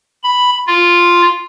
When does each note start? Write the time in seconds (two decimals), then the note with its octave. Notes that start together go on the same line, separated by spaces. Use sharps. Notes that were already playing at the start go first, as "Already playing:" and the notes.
0.24 B5
0.67 F4